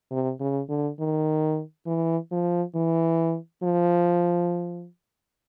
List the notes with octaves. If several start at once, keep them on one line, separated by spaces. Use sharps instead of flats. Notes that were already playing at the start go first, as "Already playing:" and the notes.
C3
C#3
D3
D#3
E3
F3
E3
F3